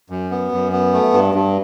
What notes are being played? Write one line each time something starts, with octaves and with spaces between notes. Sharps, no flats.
F#2
B3
F#2
B3
A3
G2
G2